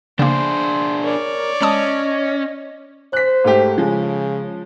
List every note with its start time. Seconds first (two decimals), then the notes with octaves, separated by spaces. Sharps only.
0.19 C#3 A#3 D4 G#4 C5
1.03 A#4 C#5 D5
1.62 G#3 C#4 D#5 A5 D#6
3.13 C5 F#6 B6
3.44 G#2 A3 G4
3.78 C#3 F3 G#3